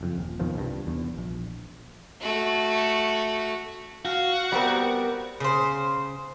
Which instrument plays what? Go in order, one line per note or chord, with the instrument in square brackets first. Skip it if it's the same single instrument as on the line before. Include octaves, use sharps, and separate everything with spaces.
[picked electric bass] F#1 F2
D#1
E2 B2 D#3 F3
C2 G2
E2
A#1
[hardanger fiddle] A3 F#4
[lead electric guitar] F#4 [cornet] F5
[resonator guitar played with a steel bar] G3 C4 A#4 [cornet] B3
[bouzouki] C#3 C5